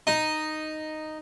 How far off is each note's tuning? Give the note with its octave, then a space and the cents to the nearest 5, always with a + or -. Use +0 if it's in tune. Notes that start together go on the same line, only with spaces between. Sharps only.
D#4 -5